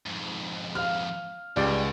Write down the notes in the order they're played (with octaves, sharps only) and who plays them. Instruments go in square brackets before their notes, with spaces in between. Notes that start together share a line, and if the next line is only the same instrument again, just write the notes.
[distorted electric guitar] F2 G#2
[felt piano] F5 F6
[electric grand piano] C#2 [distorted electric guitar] G#2 [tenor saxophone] G3